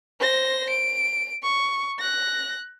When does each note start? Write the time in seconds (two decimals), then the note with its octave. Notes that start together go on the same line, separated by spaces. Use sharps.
0.20 C5 A#6
0.70 D7
1.43 C#6
1.99 F#6 A#6